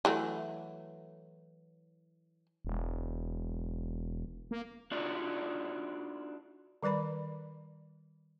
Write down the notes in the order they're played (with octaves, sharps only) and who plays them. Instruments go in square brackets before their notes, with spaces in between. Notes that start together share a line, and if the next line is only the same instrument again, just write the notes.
[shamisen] E3 F#3 A3
[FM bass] E1
A#3
[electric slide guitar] D4 D#4 F4 F#4 D5 E5
[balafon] D#3 G3 B4 D5 B5